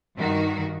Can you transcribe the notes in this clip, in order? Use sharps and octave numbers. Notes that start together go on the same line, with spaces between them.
G2 D#3 F#4